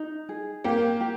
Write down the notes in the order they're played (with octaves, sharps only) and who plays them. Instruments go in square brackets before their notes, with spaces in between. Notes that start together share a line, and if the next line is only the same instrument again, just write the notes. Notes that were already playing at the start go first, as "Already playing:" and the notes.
Already playing: [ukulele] D#4
G#4
[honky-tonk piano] A#3 [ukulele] G4
[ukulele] G4